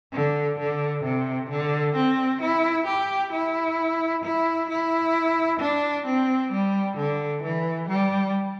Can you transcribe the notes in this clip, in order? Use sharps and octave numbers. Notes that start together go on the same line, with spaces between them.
D3
D3
C3
D3
C4
E4
G4
E4
E4
E4
D4
C4
G3
D3
E3
G3